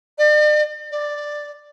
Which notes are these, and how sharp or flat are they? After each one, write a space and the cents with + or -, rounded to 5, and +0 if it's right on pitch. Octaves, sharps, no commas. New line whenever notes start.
D5 +40
D5 +5